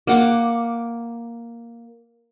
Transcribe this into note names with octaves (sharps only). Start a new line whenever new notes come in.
A#3 F#5 D6